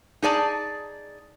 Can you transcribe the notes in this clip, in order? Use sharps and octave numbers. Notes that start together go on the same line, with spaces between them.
D#4 G#4 D5 A5